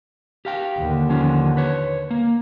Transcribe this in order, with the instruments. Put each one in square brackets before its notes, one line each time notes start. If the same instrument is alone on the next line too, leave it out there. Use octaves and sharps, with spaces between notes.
[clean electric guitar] G4 F5 G5
[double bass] D#2 D3
[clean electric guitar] F3 C#4 F4
B4 C#5
A#3